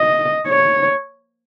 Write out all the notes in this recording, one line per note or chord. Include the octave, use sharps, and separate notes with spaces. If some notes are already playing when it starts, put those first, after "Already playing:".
Already playing: D#5
C#5